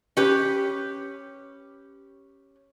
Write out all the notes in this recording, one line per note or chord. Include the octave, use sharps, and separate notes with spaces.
C#4 G4 B4